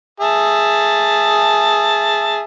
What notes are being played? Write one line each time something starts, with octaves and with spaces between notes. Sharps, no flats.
G#4 E5 A5